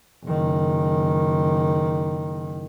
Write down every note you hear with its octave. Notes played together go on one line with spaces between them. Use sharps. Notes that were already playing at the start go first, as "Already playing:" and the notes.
F#1 D#3